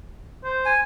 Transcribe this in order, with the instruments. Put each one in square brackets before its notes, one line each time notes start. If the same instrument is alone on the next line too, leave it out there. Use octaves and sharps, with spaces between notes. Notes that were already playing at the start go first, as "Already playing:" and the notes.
[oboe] C5
[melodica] G#5